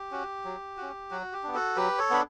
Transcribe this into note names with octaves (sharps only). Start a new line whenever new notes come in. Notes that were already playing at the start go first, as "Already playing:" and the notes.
Already playing: G4
C#4 F#4
F#3
C#4 F#4
F#3 F#4
G4
B3 D4
F#4 A4
F#3 G4 B4
A4 C#5
B3 D4 B5